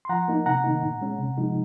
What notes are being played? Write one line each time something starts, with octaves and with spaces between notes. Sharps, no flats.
C6
F3 F#5 A#5
A#3 D#4
C3 F#5 A#5
D#3 A#3 D#4
A#2
G#3 C#4
C3
F3 G#3 D#4